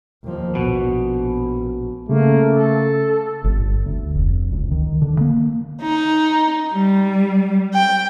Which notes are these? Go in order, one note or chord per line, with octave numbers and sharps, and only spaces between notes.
D#2 F3
A#1 B2
C#3 A3 A#3
A4
G1
D2
F1
C#2
D#3
D3
A#3
D#4
G3
G5